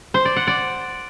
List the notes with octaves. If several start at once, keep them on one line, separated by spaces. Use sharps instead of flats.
C5
D5
F#5
D5